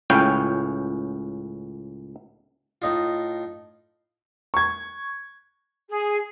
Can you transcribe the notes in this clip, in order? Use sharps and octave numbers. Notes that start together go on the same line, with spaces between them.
C#2 A2 C#4 F5 G5
A2 D#4 F4
C#6 G#6
G#4